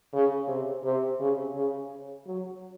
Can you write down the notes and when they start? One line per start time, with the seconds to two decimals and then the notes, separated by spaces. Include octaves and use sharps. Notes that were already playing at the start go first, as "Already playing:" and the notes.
0.13 C#3
0.48 C3
0.84 C3
1.19 C#3
1.55 C#3
2.27 F#3